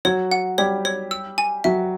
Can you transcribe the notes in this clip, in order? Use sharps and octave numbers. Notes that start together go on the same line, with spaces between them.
F#3 F#4 C#5
F#5
G3 G4 C#5
C#5
E6
G#5
F#3 F#4 E5